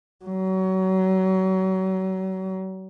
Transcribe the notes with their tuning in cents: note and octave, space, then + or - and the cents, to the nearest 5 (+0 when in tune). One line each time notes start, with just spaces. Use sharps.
F#3 +30